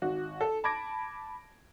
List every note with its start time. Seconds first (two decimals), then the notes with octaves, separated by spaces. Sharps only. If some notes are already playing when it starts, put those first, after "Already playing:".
0.02 G#1 F#4
0.41 A4
0.64 A5 B5 D6 G#6 A#6 D7